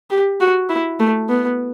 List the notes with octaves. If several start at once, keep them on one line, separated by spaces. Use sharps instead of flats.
G4
F#4
E4
A3
B3